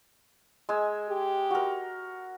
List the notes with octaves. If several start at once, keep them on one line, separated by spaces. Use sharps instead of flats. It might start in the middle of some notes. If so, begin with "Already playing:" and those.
G#3 G#5 E6
G4
F#4 A#4